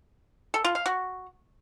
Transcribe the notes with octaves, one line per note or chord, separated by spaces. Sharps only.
A4
F4
F5
F#4